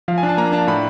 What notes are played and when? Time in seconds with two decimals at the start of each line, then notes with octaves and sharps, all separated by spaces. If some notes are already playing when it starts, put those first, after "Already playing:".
0.08 F3 F5
0.18 G#5
0.23 D4
0.29 A5
0.37 A#3 A#5
0.52 D4 A5
0.67 A2 B5